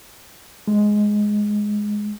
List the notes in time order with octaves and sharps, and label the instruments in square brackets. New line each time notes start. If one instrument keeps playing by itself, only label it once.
[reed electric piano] G#3